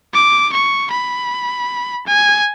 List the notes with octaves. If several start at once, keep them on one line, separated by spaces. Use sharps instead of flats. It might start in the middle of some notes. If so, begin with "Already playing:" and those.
D6
C#6
B5
G#5